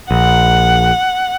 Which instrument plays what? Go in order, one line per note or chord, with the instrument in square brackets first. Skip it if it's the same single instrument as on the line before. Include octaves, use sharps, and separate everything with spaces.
[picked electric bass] A#1 [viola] F#5